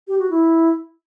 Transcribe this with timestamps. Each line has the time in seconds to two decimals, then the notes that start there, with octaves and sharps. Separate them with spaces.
0.08 G4
0.19 F#4
0.30 E4